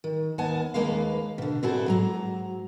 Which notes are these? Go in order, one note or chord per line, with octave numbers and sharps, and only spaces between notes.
D#3
D#2 B3 F#5 G#5 A5
D#2 G#3 A#3 B4 F5
B2 D3
A#2 C4 E4 F#4 G#4 A4
G#2 F#3 A#5